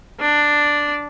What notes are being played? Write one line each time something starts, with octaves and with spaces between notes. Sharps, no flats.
D4